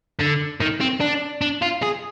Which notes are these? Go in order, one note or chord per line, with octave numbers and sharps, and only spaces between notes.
D3
D#3
C4
D4
D4
F4
G#4